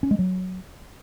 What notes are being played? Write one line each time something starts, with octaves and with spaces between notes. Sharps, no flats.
C#4
G#3
F#3